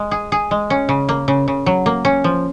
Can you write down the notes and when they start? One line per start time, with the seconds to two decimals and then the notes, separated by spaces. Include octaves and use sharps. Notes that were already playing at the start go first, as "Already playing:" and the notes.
Already playing: G#3
0.11 G#4
0.32 G#4
0.51 G#3
0.70 C#4
0.89 C#3
1.09 A#3
1.28 C#3
1.48 C#3
1.66 F#3
1.86 A#3
2.05 C#4
2.24 F3